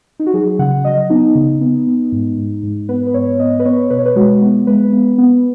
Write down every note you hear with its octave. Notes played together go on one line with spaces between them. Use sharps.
D#4
F#4
F#3 G#4
C#3 F#5
F#3 D#5
B3 D#4
C#3
B3
B3
G#2
G#2
G#2
B3 B4
B4
G#2 C#5
B3 D#5
B4
B3 C#5
B2 B4
C#5
B4
G#3 F#4
B3
G#3 B4
B3
B3